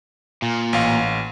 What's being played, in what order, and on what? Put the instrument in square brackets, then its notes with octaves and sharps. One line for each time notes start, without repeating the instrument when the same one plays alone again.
[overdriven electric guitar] A#2
[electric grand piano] A1 F5